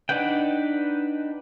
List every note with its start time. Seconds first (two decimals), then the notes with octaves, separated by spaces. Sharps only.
0.09 D4 D#4 B4 F#5 G5